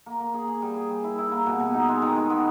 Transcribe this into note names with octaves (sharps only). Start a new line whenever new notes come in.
A#3
A#3
G#4
G#4
G3
G#4
G3
E4
E4
A#3
B2
B2
D#4
G#3
D#3
G#3
B3